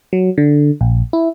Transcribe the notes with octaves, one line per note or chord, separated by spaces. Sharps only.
F#3
D3
A#1
E4